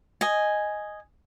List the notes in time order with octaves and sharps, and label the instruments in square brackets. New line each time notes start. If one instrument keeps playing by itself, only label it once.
[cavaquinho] D#5 G#5